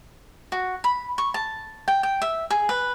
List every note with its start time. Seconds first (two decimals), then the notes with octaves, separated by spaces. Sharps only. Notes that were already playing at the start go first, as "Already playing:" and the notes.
0.52 F#4
0.84 B5
1.18 C#6
1.34 A5
1.88 G5
2.03 G5
2.22 E5
2.50 G#4
2.69 B4